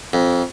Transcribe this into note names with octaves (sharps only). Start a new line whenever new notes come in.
F2